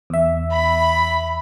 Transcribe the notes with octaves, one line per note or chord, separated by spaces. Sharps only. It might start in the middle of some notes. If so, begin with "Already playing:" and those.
E2 E5
B5